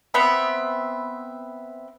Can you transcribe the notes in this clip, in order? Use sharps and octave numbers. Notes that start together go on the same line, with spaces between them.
B3 C4 E5 B5